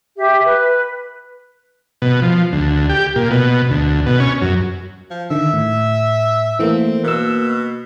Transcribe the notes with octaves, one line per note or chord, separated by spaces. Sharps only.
G4 E5
B4
B2
F3
D2
G4
A#2
B2
D2
B2
C#4
F#2
F3
D3 D#3 E5
A2
E3 A3 A#3 C4
B2 A#3 E6